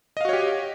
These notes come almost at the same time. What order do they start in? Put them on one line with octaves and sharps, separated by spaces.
D#5 F5 F#4 C#5 G4